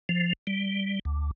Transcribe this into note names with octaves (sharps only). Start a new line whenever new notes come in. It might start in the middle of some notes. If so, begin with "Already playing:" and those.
F3
G3
D2